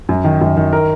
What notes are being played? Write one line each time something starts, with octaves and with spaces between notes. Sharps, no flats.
F#2
D#3
F#2
D#3
A#4